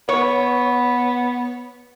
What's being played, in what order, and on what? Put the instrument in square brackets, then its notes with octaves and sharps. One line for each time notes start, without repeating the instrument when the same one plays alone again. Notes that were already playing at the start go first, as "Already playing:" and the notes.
[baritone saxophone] B3 [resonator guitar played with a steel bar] C#5